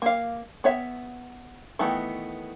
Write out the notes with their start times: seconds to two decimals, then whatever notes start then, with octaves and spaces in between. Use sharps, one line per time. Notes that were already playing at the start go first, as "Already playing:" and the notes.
0.02 A#3 F5
0.64 B3 C#5 E5
1.79 D#3 E3 A3 B3